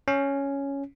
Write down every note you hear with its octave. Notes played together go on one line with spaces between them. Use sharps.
C#4